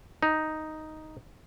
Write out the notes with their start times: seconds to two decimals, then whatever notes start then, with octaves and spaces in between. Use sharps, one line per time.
0.23 D#4